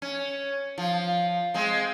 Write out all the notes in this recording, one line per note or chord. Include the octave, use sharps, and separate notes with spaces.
C#4
F3
G#3 C4